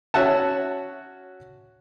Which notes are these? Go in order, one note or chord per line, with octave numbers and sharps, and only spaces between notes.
C#4 F#4 E5 F#5 A5